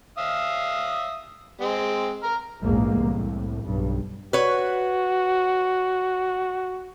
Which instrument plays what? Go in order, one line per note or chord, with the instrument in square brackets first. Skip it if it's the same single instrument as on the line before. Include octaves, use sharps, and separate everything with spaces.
[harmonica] E5 F5 D#6
G#3 C4
A#5 F6
[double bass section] A#1 E2 G#2 G#3 A#3
C2 A2
B1 G2
[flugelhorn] F#4 [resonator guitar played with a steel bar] B4 C#5